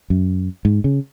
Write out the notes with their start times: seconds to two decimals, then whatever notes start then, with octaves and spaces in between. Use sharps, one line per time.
0.10 F#2
0.65 G#2
0.84 C#3